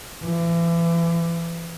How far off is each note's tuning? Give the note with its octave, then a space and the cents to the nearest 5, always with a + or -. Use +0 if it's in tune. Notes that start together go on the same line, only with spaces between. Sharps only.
E3 +35